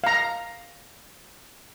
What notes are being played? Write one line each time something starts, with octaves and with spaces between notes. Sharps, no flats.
F5 A#5